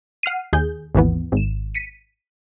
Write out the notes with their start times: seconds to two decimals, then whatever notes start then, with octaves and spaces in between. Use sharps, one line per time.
0.23 F#5 F6 C7 D#7
0.53 D#2 G#4 G6
0.95 G#1 D#2 E3 B3
1.32 G#1 E7
1.75 B6 C#7 D#7